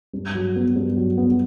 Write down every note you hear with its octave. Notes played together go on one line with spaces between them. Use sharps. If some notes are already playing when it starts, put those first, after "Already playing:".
G2
F#3
B3
G2
F#3
B3